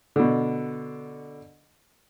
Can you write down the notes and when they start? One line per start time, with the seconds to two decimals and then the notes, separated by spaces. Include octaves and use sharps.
0.16 B2 D3